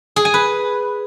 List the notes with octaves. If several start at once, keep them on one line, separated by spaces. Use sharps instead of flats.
G#4
G#5
B4